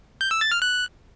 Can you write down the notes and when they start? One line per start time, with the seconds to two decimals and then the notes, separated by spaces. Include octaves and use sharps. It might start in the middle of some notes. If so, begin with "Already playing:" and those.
0.21 G6
0.31 E6
0.41 A6
0.51 F6
0.62 F#6